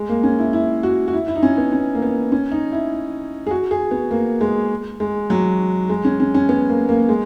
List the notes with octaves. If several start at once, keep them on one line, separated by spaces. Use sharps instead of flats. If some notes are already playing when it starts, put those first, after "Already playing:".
Already playing: G#3
A#3
C#4
E4
E4
F#4
F#4
E4
E4
D#4
C#4
B3
C#4
A#3
B3
C#4
D#4
E4
G#4
F#4
G#4
B3
A#3
G#3
G#3
F#3
G#3
C#4
C#4
C#4
B3
A#3
A#3
G#3